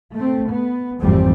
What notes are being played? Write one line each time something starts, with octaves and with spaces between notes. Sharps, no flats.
A3 C4
B3
G#1 F2 E3 G3 A3 C4